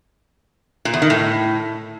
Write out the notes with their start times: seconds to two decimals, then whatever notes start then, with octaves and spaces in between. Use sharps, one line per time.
0.85 A#2
0.94 E2
1.02 D#3
1.10 A2